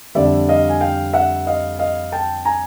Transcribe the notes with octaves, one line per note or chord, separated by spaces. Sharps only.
F2 D3 G3 D5 E5
D#5 F5
G#5
F5 G5
E5 F#5
D#5 F5
D#5 F5
G5 A5
G#5 A#5